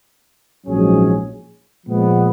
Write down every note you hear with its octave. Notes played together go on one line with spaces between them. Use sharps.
A#1 G#2 F#3 C#4 G#4
A#2 F3 G#3 B3